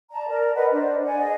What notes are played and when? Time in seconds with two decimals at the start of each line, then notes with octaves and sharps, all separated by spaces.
0.11 D5 A5 A#5
0.29 A#4 D5
0.55 B4 D5 D#5 F#5
0.71 D4 C5 D5
1.04 D5 F#5 G#5
1.19 G#4 D#5